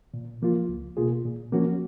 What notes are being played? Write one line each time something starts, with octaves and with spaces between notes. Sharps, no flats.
A#2
F3 A#3 F4
C#2
B2 A#3 F4 G#4
A#2
F3 A#3 C#4 F#4